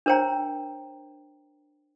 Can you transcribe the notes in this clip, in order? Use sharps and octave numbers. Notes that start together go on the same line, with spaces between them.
D4 A#4 C5 C#5 G5 A#5